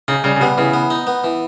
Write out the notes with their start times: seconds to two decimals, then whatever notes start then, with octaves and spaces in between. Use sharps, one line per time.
0.08 C#3 D#4
0.24 C#3 G3
0.36 C#3
0.41 C3 B3
0.58 C#3 E3
0.73 B3
0.90 D#4
1.07 B3
1.24 E3